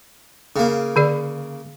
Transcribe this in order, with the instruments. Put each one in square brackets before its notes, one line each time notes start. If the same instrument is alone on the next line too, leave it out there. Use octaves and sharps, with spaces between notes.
[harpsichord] C#3 A#3
[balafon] D3 G#4 D5